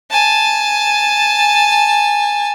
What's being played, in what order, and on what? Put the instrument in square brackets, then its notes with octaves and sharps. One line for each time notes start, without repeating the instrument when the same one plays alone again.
[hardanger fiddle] G#5 A5